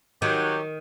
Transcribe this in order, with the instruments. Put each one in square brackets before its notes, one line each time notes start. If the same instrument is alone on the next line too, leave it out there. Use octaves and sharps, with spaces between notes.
[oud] D#3 [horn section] F#3 G4